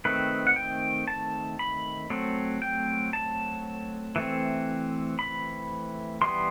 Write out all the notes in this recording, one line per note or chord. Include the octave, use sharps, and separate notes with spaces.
D#3 A3 C4 B4
F#5
G5
A5
B5
F#3 A3 C4
G5
A5
E3 A3 C4
B5
E3 G3 B3 C6